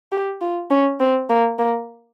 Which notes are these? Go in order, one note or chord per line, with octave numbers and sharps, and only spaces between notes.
G4
F4
C#4
C4
A#3
A#3